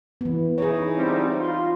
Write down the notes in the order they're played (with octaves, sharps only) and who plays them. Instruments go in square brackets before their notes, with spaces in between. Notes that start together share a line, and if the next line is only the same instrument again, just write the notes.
[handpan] E3 B3
[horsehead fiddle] D#4 E4 [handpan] G#4 C#5
[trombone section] C#2 F#3 G3 [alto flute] C4
[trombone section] F4 [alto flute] C6